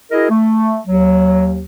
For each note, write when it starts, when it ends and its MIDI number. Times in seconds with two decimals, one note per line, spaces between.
0.11 0.27 64
0.11 0.27 66
0.11 0.27 68
0.11 0.27 70
0.11 0.27 75
0.30 0.80 57
0.87 1.65 39
0.87 1.65 54